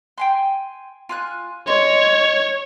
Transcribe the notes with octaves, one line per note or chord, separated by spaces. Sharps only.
G5 G#5 C6
F4 G#5 F#6
C#5 D#5 C6